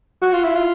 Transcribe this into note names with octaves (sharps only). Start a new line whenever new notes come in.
F#4
F4
E4
F4